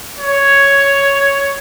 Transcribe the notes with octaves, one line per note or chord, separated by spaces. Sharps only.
C#5